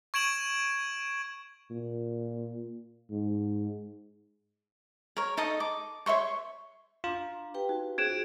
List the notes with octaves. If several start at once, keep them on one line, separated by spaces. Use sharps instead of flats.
C#6 G#6 D7 E7 F#7
A#2
G#2
A#4 C#5
D#4 A4 D#5 D#6
D6
C#5 E5 C6 C#6
D4 F4 A#5
G4 B4 G5
D#4 F#4
C#4 G#4 C5 G#6 D7 E7